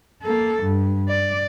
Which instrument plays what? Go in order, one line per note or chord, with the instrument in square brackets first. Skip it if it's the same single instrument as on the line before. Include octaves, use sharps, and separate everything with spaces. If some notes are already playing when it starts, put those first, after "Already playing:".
[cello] A#3 A4
G2
D5